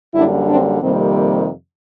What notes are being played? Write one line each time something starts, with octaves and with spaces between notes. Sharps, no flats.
F#2 D3 G3 A#3 D4 E4
C4 D4
F2 C3 D#3 G3 A#3 C4